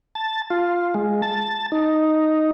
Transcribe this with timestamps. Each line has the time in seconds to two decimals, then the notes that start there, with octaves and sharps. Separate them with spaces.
0.15 A5
0.50 F4
0.94 G#3
1.22 A5
1.72 D#4